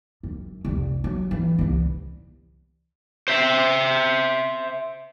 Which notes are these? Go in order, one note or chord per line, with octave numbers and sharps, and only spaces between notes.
F#2
C2 F2
F#3
E3
C2 E3
C5 E5